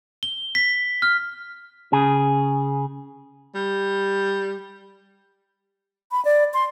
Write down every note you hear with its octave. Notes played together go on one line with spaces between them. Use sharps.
G7
B6
F6
C#3 G#4
G3
B5
D5
C6